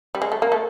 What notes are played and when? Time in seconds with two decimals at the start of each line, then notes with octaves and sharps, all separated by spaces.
0.15 G3
0.22 G#3
0.32 A3
0.42 A#3
0.52 A3